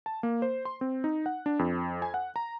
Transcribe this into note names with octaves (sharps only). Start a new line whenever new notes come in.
A5
A#3
C5
C6
C4
D#4
F#5
D4
F2
G#5
F#5
A#5